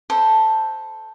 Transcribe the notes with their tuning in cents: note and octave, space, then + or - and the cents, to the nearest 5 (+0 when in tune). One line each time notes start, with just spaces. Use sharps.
A4 +0 C5 +0 B5 -35